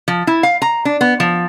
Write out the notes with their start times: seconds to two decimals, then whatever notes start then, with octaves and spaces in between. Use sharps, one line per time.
0.08 F3
0.27 E4
0.43 F5
0.62 A#5
0.85 D4
1.01 B3
1.20 F3